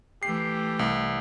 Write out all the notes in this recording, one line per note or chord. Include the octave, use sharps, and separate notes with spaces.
E3 A3 G4 C7
C2